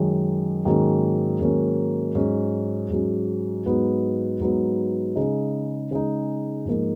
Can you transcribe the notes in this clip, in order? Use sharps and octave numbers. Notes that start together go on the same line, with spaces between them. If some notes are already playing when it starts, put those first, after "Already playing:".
Already playing: F#2 D#3 G#3 C#4
G#2 D#3 F#3 A#3 C#4
G#2 D#3 F#3 A#3 C#4
G#2 F#3 C#4
G#2 F#3 C#4
G#2 F#3 B3 D#4
G#2 F#3 B3 D#4
C#3 G#3 D#4
C#3 G#3 D#4
G#2 F3 A#3 D#4